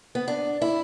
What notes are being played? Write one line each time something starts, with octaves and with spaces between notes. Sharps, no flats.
B3
D4
E4